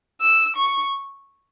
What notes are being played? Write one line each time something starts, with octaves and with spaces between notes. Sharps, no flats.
E6
C#6